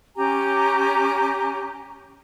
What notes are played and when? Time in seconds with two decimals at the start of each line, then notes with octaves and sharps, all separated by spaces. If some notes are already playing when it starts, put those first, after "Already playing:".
0.16 C#4 G4 G#5 A#5